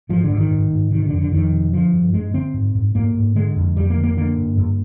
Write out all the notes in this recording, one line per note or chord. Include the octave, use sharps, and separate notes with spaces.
G#2 F3
D3
G#2
D#3
G#2
G#2
C3 D#3
D3
F2
D3
F2 D#3
C3
D3 F3
G2
G2 G#3
D3 C4
G#2
G#2
G#2 A#3
G#2
D3 G#3
F2
F2 G3
A#3
D3
A#3
D3 A#3
G2
G2